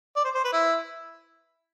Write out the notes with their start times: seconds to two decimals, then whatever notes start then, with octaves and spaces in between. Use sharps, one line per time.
0.16 D5
0.24 C5
0.35 C5
0.44 B4
0.53 E4